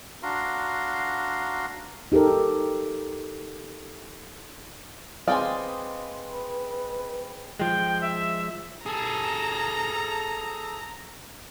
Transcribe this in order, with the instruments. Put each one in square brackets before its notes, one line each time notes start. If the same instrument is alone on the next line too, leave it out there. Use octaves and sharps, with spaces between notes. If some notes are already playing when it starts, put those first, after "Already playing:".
[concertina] D4 F#4 F5 A#5 C6
[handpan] D#4 G4 A4 A#4
[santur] G#3 C4 D#5 [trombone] B4 [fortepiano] D5 G5 G#5 [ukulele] F5
[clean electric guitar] F3 G#3 [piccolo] G5
[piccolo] E5
[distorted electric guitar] G#4 A4 [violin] A#5